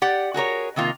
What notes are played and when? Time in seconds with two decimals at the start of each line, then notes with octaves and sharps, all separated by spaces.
0.02 G4 D5 F#5
0.34 F#4 G#4 A#4 C#5
0.76 C3 D#3 A#3 F4